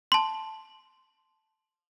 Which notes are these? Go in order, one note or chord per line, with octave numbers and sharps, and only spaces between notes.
A5 C6